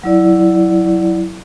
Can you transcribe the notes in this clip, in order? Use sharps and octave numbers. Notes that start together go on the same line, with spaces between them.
F#3 E4 D5